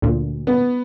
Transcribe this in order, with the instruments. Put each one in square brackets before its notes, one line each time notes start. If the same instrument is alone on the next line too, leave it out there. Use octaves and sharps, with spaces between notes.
[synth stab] D2 A#2
[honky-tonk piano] B3